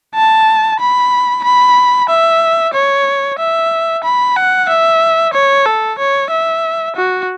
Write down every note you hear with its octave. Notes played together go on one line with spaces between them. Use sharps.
A5
B5
B5
E5
C#5
E5
B5
F#5
E5
C#5
A4
C#5
E5
F#4